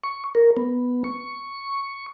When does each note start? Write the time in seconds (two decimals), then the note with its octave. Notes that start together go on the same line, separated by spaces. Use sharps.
0.04 C#6
0.35 A#4
0.57 B3
1.04 C#6